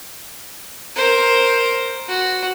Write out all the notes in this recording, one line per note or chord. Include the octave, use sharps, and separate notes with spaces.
A#4 C5
F#4